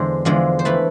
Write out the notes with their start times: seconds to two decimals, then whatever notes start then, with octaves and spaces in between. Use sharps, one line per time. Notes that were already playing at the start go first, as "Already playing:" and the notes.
Already playing: E2 D3 G#3 C5
0.25 E2 D3 F3 G#3
0.59 C5
0.65 E3 A3 B4